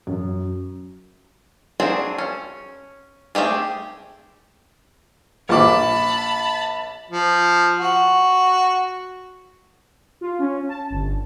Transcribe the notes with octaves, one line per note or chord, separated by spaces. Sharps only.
F#2
F#3 C4 D4 G#4
C#4
A3 C4 G4 G#4
A#1 A5 B5 D6
F3
F#4
F4
C#4
A5
G1